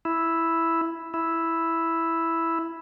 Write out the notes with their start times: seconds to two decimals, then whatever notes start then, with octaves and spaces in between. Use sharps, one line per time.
0.05 E4
1.14 E4